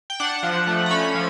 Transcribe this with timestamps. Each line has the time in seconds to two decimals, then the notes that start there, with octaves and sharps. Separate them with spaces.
0.10 G5
0.20 D4 F#5
0.43 F3
0.67 A3
0.86 A#5
0.91 C#4 B5
1.15 F3